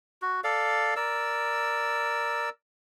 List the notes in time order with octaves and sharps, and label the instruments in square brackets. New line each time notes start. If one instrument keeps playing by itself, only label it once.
[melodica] F#4
A4 D5 F5
A#4 D5 E6